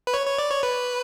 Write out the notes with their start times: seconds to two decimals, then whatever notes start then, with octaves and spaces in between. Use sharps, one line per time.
0.07 B4
0.14 C#5
0.26 C#5
0.39 D5
0.50 C#5
0.63 B4